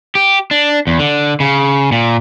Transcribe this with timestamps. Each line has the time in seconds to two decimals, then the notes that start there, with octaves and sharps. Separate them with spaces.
0.15 G4
0.51 D4
0.87 E2
0.99 D3
1.40 C#3
1.92 A#2